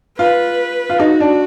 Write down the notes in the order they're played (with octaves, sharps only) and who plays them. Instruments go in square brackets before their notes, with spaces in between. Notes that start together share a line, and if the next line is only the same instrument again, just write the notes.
[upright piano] F4 [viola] B4
[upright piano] F4
[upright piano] D#4 [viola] F#4
[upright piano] D4